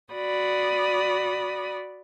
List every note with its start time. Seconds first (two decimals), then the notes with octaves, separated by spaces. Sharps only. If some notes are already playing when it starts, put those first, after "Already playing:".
0.13 F#4 D5 B5 D#6